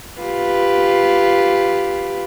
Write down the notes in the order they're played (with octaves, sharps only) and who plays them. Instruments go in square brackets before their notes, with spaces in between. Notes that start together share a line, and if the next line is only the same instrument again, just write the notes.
[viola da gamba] F4 G4 B4